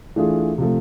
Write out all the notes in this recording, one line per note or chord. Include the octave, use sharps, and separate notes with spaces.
E3 A3 D4 F4 G#4
C3 F3 A3